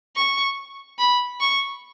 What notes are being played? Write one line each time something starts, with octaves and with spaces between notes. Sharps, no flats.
C#6
B5
C#6